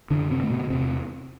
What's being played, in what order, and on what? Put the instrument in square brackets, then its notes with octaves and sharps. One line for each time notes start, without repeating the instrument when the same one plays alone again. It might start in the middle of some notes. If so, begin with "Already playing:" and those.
[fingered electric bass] F#2 D3 D4
C3 C4
D3 A3
B2 B3
E2 C3 C4